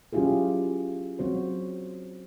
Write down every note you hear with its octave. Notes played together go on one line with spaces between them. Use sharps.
F#3 C#4 E4 F4 G4 G#4
F#3 C4 F#4 C5